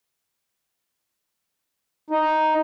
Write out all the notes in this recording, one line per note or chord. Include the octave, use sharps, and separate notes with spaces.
D#4